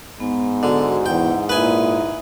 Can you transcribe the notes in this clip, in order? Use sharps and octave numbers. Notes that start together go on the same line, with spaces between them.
G#2 B3
D3 F#4
E2 E4 F#5 G5
A#2 E4 B4 E5 G#5 D#6